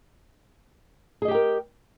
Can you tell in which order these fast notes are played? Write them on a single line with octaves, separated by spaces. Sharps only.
G#4 D#5 G4 G5 A#4